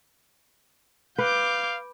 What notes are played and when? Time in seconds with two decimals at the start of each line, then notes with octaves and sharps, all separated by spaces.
1.18 B4 F5 D6 G6